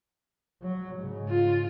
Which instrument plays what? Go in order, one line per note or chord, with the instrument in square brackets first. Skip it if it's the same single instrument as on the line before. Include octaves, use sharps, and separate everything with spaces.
[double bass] F#3
G#2 C#3
[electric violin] F4